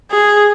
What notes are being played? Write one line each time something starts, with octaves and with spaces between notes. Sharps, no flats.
G#4